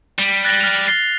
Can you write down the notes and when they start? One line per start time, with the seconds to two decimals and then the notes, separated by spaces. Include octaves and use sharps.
0.19 G3
0.44 F#6 A6 A#6
0.60 F6 F7
0.87 A6 C7 G7